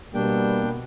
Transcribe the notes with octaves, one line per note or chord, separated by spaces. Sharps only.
B2 G3 A#3 B3 D4 G5